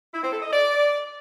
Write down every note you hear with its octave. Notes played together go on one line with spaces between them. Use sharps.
E4
C4
A4
D#5
D5